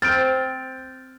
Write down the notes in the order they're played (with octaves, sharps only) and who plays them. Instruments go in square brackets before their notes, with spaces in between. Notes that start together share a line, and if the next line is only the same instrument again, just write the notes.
[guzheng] C4 [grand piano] F6 G6 D7 [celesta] A6